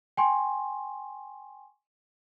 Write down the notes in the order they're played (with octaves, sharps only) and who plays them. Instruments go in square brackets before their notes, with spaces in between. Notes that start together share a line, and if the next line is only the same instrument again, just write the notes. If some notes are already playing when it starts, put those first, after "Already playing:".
[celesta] G5 G#5 C6 C#6